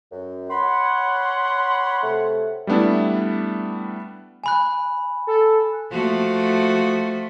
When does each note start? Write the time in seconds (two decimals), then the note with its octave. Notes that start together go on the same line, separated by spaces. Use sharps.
0.12 F#2
0.50 C#5 F#5 B5 C6
2.03 C3 A3
2.67 G3 A3 B3 D4 E4
4.44 G#5 B5 F#6
5.27 A4
5.92 F3 A3 F#4